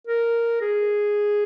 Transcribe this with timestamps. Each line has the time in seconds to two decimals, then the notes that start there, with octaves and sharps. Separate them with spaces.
0.07 A#4
0.62 G#4